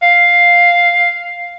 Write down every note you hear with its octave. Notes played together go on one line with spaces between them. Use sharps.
F5